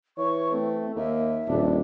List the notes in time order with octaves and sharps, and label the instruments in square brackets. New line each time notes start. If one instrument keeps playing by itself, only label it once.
[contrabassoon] E3 [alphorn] C#5 [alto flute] C#6
[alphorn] A3 [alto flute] C4
[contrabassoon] D#2 [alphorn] A#3 [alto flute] E5
[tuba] D#1 [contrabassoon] F2 [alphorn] D4